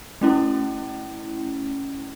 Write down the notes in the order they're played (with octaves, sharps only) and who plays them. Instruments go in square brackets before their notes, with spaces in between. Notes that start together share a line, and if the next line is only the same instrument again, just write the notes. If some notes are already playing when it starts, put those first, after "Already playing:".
[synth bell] A3 C#4 E4